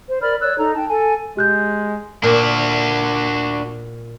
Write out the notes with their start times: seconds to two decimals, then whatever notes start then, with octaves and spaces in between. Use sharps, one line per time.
0.08 C5
0.21 A#4 D5 B5 F6
0.41 C#5 D5 E6 F#6
0.58 D#4 A4 A#5
0.75 G5 A5
0.89 A4 G#5
1.37 G#3 G4 F#6 G6
2.23 A#2 D4 F#4